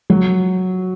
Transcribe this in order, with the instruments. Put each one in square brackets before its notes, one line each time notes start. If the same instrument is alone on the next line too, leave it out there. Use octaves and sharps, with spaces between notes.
[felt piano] F#3